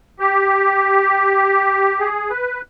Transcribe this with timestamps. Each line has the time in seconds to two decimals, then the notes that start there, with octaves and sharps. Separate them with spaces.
0.20 G4
2.00 G#4
2.30 B4